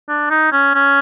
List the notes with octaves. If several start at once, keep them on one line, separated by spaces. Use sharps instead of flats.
D4
D#4
C#4
C#4